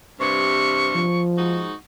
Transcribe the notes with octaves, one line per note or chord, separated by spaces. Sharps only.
G2 C3 C#6
F3
G#2 D#4 F#4